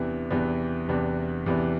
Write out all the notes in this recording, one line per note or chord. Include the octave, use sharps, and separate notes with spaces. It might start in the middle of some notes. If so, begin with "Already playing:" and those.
Already playing: E2 C3 E3 B3 D4
E2 C3 E3 B3 D4
E2 C3 E3 B3 D4
E2 C3 E3 B3 D4